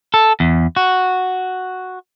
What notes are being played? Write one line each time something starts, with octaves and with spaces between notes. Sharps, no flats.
A4
E2
F#4